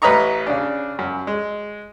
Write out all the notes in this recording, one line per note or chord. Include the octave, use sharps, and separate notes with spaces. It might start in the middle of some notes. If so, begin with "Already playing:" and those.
A1 B4 C#5 D#5 A#5 C#6
C#3 D4
F#2
G#3